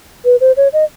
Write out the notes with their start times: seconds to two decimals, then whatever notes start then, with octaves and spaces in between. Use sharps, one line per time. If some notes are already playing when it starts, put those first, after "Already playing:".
0.25 B4
0.41 C5
0.57 C#5
0.73 D#5